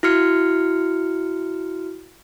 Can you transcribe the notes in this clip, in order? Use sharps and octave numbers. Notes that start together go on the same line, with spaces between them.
E4 F#4 F6 C#7